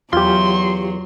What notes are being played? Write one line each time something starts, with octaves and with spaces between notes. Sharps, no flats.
E2 F#3 F4 G4 C6